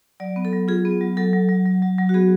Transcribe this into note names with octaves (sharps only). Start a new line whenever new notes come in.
F#3 D5
B3
A4
F#3
F4 G#4
B3
F#3
F#3 A4
F#3
F#3
F#3
F#3
F#3
F#4
B3 G#4